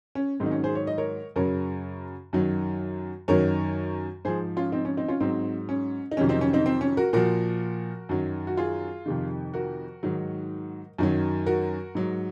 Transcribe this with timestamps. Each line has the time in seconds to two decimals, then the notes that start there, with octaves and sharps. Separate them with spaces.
0.15 C#4
0.40 G#2 D#3 F#3 C4
0.46 D#4
0.51 C#4
0.64 G#4 C5
0.75 C#5
0.87 D#5
0.98 A#4 C#5
1.36 F#2 C#3 F#3 A#4 C#5
2.33 F#2 D#3 F#3
3.28 F#2 D#3 F#3 A#4 C#5
4.25 G#2 F3 G#4 C5
4.56 C#4 F4
4.72 C4 D#4
4.85 C#4
4.97 C4 D#4
5.08 C#4 F4
5.20 G#2 F#3 C4 D#4
5.69 C#4
6.11 D#4
6.17 F2 C3 D#3 F#3 C#4
6.29 C4 D#4
6.41 C#4
6.53 C4 D#4
6.66 C4
6.81 C#4
6.97 F#4 A#4
7.13 A#2 F3 F#4 A#4
8.09 F#2 D#3 F#3
8.47 F#4
8.57 F4 G#4
9.06 F2 C3 D#3
9.54 F#4 A#4
10.03 G#2 D#3 F#3
10.98 F#2 D#3 F#3
11.46 F#4 A#4
11.95 G#2 F#3